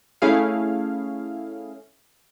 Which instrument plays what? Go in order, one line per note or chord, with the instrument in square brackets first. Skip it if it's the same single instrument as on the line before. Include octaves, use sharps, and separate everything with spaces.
[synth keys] A3 C#4 E4 G#4 F5